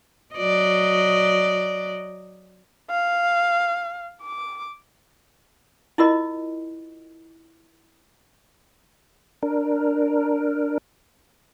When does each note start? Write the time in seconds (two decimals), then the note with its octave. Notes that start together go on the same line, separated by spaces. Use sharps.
0.35 F#3 D5 D#5
2.90 F5
4.22 D6
5.98 E4 F4 A#4 D#5
9.43 D4 A#4